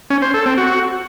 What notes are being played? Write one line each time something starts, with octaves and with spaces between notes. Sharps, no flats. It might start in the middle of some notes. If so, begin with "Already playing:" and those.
C#4
C5
A4
C4
F#4